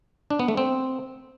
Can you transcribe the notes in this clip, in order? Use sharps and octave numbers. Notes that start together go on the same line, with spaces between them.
D4
B3
A3
C4